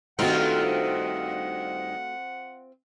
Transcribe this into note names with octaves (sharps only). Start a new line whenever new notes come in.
G2 D#3 A3 C4 D#4 F4 F#4 F#5